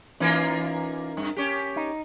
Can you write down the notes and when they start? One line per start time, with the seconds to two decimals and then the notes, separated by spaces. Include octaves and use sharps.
0.20 E3 A#3 C#4 D#4 F4
1.17 G2
1.36 C#4 G4
1.76 D#4